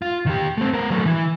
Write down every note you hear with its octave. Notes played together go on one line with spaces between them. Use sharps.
F4
D#3 G4
A3 C4
B3 A#4
F#3 A3
E3